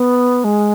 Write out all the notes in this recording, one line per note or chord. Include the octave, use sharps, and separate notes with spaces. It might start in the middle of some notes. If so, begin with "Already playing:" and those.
Already playing: B3
G#3